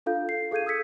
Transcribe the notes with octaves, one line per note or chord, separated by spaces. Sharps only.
D4 F4 A4 F5 G6
C7
G#4 A4 F5 G6 G#6 D#7
D#6 E6 G#6 B6 C#7